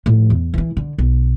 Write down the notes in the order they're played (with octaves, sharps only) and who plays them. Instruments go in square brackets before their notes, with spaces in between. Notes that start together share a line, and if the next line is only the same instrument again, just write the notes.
[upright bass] A2 F3
E2
E3 E4
D3
B1